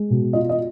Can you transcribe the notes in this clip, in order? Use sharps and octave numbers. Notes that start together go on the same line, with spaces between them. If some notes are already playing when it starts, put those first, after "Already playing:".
Already playing: G#3
B2
F4 D#5
D#5